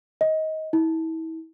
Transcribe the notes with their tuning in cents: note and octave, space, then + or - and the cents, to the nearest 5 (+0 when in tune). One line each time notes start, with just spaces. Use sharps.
D#5 +20
E4 -35